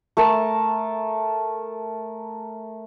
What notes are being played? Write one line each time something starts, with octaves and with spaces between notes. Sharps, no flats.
A3 A#4 A5